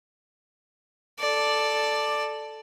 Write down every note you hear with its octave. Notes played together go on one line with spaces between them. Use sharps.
A4 D5